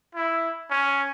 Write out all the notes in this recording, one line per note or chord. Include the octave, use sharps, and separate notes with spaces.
E4
C#4